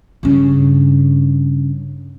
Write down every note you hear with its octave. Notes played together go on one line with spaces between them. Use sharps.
G2 C#3